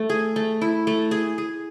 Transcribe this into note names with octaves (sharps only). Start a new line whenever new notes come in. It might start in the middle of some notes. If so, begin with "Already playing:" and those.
Already playing: A3
G#4
A3
E4
A3
G#4
G#4